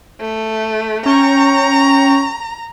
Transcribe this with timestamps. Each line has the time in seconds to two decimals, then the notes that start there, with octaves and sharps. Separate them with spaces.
0.20 A3
1.05 C#4 G5 A#5 C#6